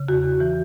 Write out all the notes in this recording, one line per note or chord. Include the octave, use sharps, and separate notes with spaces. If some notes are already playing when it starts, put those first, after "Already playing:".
Already playing: C#3
E2 F#4
E2
E3